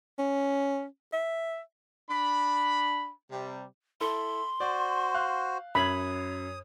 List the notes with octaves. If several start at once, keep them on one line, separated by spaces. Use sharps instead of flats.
C#4
E5
D4 B5
C3 G3
E4 A4 B5 C6
F#4 C5 D5
F5 F#6
F#2 C#5 B5 D#6 G#6